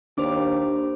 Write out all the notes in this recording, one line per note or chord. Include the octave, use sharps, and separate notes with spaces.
D#2 D4 C5 D6